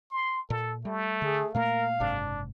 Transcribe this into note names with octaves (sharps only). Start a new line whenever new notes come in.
C6
A#2 A4
G3 A3
D3 G#4
A#2 A3 A#3 A#4 F5
F#1 G#2 C3 D4